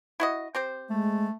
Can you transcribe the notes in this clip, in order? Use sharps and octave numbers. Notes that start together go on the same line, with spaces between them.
E4 F#4 D#5
C4 G4 C5
G#3 A3